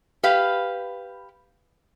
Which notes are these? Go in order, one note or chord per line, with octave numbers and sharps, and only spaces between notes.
G4 B4 F5